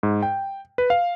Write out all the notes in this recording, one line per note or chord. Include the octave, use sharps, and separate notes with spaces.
G#2
G5
B4
F5